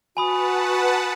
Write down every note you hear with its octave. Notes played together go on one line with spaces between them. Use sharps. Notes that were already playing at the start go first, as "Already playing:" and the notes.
F#4 B4 F#5 G#5 A5 B5 D#6